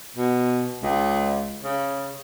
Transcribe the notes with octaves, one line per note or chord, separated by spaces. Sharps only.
B2
C#2
C#3